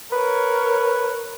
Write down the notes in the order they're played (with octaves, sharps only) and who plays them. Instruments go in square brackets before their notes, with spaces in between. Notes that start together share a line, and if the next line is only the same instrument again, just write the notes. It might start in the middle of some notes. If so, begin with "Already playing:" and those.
[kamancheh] A#4 C#5 [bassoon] B4